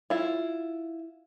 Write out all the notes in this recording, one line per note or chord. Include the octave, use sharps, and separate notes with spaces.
E4 F4